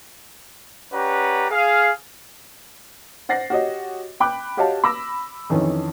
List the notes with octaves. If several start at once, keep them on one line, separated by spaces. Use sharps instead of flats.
C#4 G4 B4 D5 F#5 A#5
G#4 F5
C5 F#5 A6 A#6 C7
F#4 G4 C#5 D#5
G5 B5 D6 F#6
F#4 G4 C#5 D#5 F5 A5
B5 D6 E6 A#6
F2 D#3 E3 C#4